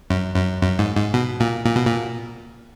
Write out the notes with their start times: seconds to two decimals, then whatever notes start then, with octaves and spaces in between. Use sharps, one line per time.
0.10 F#2
0.36 F#2
0.62 F#2
0.79 G#2
0.97 G#2
1.14 B2
1.40 A#2
1.66 A#2
1.76 B2
1.86 A#2